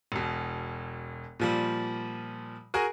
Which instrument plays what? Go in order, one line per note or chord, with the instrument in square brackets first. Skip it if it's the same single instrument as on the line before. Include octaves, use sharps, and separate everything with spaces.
[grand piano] E1 B2
A#2 F3 G3
F#4 G#4 A#4 G#5